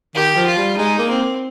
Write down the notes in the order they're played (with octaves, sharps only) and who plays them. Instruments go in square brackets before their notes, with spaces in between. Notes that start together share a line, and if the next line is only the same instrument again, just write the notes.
[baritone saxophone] D#3 [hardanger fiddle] G4
[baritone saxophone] F3
[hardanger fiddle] F4
[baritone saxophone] G3
[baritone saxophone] G#3 [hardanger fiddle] D#4
[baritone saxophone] A#3
[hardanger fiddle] C4